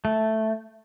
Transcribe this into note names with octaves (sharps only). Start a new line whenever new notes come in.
A3